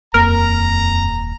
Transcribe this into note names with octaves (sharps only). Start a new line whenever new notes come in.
D#1 F2 A#3 A#4 A#5